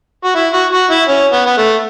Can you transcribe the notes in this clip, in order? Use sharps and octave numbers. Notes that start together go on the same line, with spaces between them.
F#4
E4
F#4
F#4
E4
C#4
B3
B3
A3